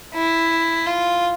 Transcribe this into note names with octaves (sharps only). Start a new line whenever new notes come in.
E4
F4